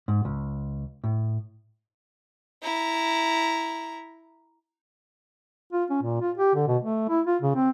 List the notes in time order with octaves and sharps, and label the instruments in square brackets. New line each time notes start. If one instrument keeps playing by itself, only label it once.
[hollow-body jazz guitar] G#2
C#2
A2
[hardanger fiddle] E4 A#5
[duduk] F4
C#4
A#2
F4
G4
D3
B2
A3
E4
F4
C#3
C4